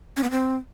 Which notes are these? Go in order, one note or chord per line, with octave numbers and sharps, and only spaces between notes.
C#4
B3
C4